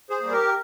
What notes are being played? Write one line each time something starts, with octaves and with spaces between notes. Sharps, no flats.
G#4 C5
G3 A#3
G4 A#4